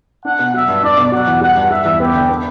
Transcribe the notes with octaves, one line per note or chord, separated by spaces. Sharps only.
D4 F#5
B2
F#3 E5
G2
D4 D5
B2
F#3 F#5
E2
G3 F#5
G2
G3 E5
E2
B3 G4
D3
B3